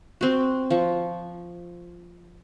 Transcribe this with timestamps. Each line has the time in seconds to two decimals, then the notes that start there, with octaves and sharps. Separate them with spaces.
0.21 C4 F#4
0.70 F3 C#6